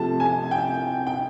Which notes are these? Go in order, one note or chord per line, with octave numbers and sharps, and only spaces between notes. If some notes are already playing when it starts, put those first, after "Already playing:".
Already playing: C3 F3 A3 A5
G#5
G5
G5